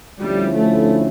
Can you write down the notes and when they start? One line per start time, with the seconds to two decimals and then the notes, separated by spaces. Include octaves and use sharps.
0.20 D2 D3 F3 G3 C#4 E4
0.55 A3